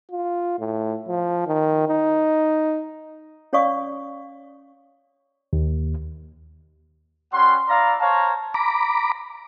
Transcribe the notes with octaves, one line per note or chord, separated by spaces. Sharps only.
F4
A2
F3
D#3
D#4
C#4 C#5 D5 F5 C#6 D#6
D#2
G3 C#4 F#5 C6
E4 D5 F5 A#5
C5 C#5 F5 A5 A#5
A#5 B5 D6